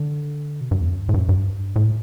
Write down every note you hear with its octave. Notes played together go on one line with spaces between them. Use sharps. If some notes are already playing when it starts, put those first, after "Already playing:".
Already playing: D3
B2
G2
E2
F#2
G2
A2
G2
F#2
G2
A2